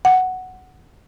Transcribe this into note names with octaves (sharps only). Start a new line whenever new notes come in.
F#5